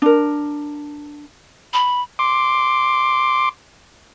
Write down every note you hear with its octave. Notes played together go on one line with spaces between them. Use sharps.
D4 A#4
B5
C6 D6